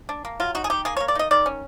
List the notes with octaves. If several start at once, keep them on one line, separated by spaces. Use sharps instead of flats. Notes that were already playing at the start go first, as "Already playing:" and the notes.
D4
A#3
F#3 F4
D#4 F#4
G#4
D#4 G4
A#3 G#4
C#5
A#3
D5
D#4 D#5
D#3 D5
C#4